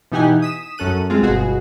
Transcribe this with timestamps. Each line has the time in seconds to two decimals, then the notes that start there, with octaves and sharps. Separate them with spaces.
0.12 B2 E3 D#4 G4 F#5 G#5
0.42 D#6 B6 E7
0.78 F#2 C#4 A4 F#6 D#7
1.10 G#3 C4 F4
1.22 G1 B2 F#4 G#4